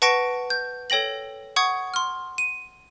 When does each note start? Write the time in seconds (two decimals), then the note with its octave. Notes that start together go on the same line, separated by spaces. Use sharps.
0.02 B4 F#5 A5 C#6 A#6 D7
0.50 G6
0.90 A4 C#5 G5 A#6 F#7
1.56 F#5 C#6 D#6 G#6
1.94 C6 F6
2.38 D#7